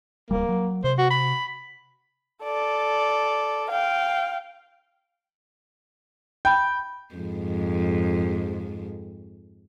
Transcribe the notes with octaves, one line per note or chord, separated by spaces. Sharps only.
D1 G#1 G3 A#3
F#3
C3 C5
F#4
B5
A4 D5
F5 G5
G5 B5 G6
F2 G#2